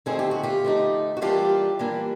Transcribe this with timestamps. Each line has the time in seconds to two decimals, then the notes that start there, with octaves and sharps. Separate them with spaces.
0.06 D3 F3 A3 C4 D#4 G#4
0.19 G4
0.31 F#4
0.43 F4 G4
0.64 D3 F3 A3 C4 D#4
1.17 F#4
1.21 E3 G3 A#3 D4 F4 G4
1.79 E3 G3 A#3 D4